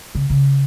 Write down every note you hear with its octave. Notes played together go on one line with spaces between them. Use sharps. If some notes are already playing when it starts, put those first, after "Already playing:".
C#3
C#3